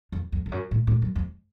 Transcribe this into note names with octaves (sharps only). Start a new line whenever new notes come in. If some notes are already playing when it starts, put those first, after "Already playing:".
F2
F2
F2
F#2
A2
A2
F#2
F2